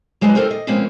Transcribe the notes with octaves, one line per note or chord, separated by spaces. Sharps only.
F#3 G#3 D4 D#4 F#4 B4
D#2 F3 C4 A4 A#4 C5
D#5
B2 F3 G#3 A#3 C4 C#4